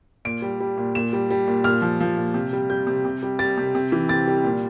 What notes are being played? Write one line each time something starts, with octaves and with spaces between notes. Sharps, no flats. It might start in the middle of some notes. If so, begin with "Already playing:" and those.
A#2 D7
G3
G3
A#2
A#2 E7
G3
G3
A#2
A#2 F6
F3
F3
A#2
C3
G3
G3 G6
C3
C3
G3
G3 A6
C3
C3
E3
C3 A6
G3
A#2